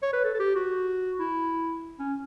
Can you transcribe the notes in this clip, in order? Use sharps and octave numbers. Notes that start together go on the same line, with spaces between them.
C#5
B4
A4
A4
G4
F#4
E4
C#4